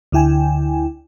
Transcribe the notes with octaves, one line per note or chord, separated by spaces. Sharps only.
D2 D3 E4 G5 G#5